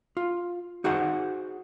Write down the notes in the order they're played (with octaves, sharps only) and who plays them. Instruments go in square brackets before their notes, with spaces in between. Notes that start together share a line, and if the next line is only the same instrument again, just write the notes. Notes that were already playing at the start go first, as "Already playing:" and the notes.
[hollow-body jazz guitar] F4
D#4 F#4 G#4 C5 F#5